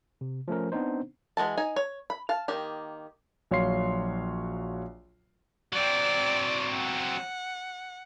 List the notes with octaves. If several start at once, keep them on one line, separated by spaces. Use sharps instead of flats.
C3
F3 A3 C#4 A#4
B3 C4 D4 D#4 C5
E3 G#3 F#4 A5
D#4 G#5
C#5
B5
F5 A5
D#3 A#3 G4
A#1 F#3 C#5 F5 C6 C7
F#3 C4 D5
F#5